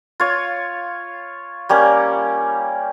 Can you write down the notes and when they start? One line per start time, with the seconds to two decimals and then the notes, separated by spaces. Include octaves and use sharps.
0.20 F4 C#5
1.69 G3 A#3 C#4